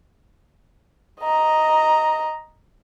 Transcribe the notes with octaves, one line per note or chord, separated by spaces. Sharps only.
D#5 A#5